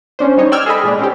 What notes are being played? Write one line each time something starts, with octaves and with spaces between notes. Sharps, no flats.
C#4 D4 C5
G3 D#4 C#5 D#5
D5 G5 E6 F6 G#6
G#4 A4 D#5 B5
A#2 G#3 D4
C4 C#4 G4